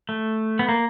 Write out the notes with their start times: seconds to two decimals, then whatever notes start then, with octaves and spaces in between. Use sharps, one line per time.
0.09 A3
0.59 B3
0.69 A#3